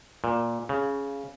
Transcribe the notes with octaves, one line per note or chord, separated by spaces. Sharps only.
A#2
C#3